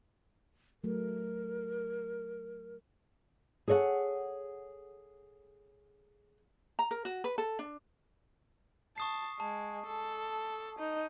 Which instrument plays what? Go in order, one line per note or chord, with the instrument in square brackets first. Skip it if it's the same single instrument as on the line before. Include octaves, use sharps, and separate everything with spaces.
[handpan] F#3 A3 [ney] A#4
[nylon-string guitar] G#4 A4 C#5 D5 F#5 G#5
[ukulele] A#5
A#4
F#4
B4
A4
D4
[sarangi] A5 [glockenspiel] C#6 D#6 C7
[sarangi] G#3 [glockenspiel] A5
[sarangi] A4
D#4